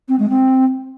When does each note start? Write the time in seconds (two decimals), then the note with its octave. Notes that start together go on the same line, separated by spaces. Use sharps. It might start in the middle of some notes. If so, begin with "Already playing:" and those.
0.08 C4
0.19 G#3
0.30 C4